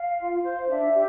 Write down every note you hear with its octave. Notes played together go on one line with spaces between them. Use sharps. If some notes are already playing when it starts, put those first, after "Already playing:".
Already playing: F5
F4
C5
D4 E5
G4